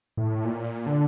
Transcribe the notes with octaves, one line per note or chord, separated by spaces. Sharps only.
A2
A#2
D3